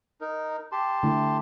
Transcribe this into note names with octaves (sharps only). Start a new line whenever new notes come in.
D#4 A#4
G4 A5 C6
D3 A3 E4